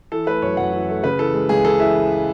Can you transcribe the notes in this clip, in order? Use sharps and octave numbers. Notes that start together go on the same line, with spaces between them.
E3 A4
A3 B4
F#2 C#5
F#2 F#5
E3
A3
C#3 B4
E3 A4
G#3
C#2 G#4
C#3 A4
E3 E5